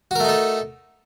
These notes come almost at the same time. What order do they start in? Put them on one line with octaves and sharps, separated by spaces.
F#4 A#4 A3 D#4 A4